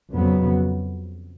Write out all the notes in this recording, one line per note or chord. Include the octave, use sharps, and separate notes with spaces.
F2 C#3 F#3 B3